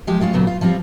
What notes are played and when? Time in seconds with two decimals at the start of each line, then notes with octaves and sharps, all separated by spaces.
0.07 F3 G#3 G4
0.20 G3 G#3 C#4 F4
0.33 D2 A#2 C#3 F#3 B3
0.47 F4
0.61 F3 G3 C4 F4